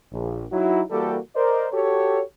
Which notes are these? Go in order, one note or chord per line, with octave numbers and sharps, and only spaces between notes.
A#1
F#3 D#4 E4 F#4
E3 G3 A#3 F#4 G4 A4
A#4 C5 D5 D#5
F#4 G4 A4 C#5